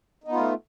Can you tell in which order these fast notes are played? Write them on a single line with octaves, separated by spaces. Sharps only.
D#4 B3 F4 A3